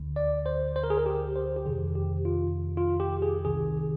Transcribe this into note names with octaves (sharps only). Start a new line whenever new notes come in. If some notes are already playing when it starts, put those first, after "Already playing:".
Already playing: D2 D3
D5
C5
C5
A#4
G#4
A#4
G4
C5
G4
F2 C3 D#3 G#4
G4
F4
F4
G4
G#4
C2 C3 D#3 G#4